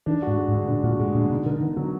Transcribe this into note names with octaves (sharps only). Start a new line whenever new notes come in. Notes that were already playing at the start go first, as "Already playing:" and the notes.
D#3 D4
F#4
G#2
G#3
G#2
D3
A#2 D4
A#2 F#4
G#2 G#3
A#2 D3
B2 D#4
D3 A#4
D3
D#3 B3
D3 F#3